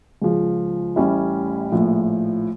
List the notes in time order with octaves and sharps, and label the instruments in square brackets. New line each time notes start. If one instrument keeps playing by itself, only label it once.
[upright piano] C#2 C#3 F3
A1 A2 G3 C#4 E4
A#1 A2 F3